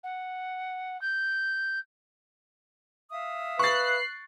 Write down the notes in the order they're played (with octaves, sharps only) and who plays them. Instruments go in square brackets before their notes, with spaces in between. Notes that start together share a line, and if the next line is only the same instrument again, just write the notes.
[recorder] F#5
G6
[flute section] E5 F5 D#6
[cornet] B4 [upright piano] C#6 A6 [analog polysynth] F#6 C7